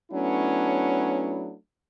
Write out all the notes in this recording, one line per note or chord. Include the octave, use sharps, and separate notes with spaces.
F#3 A3 B3 C#4 D4 E4